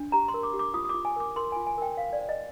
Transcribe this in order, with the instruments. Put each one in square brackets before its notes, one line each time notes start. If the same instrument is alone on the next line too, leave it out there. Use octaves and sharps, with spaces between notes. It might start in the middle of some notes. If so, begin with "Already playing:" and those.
Already playing: [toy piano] D4
G4 A#5
C6
A#4
D6
G4
D6
F4 D#6
D#6
D6
F4
G#5
A#4 D6
A#4 C6
F4 G#5
G#5
A#4 G5
C5 F5
D5
C5
D#5